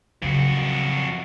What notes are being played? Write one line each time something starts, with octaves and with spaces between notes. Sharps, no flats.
F2 C#3 F#3 F#4